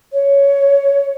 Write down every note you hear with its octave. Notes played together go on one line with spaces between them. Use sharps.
C#5